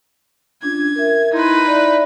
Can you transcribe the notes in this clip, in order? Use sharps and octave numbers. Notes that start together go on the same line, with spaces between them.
C#4 D4 F4 G#6
A#4 E5
D#4 E4 B4 C6
D5 E5